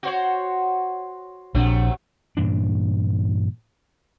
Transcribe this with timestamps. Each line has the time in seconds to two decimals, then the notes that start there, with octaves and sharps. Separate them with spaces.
0.03 F#4 C5 C#5
1.55 A#1 C3 F#3 A3 D4
2.37 G2 A#2 E3 D4